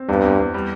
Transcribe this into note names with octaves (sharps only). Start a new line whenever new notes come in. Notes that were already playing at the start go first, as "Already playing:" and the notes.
Already playing: C4
E2 G2
E2
E2
G3